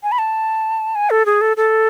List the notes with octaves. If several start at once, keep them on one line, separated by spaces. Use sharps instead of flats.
G#5
B5
A5
G#5
A4
G#4
A4
A4